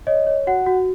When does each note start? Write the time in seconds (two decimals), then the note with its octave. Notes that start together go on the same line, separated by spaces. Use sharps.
0.07 C#5 D#5
0.26 C#5
0.47 F#4 F#5
0.66 F#4